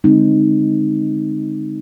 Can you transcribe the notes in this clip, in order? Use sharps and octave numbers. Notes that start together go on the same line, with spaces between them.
D3 G#3 C4 D#4